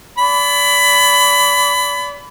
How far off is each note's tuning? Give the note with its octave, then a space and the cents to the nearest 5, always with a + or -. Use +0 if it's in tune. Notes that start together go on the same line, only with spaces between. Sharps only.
D5 -35 B5 +20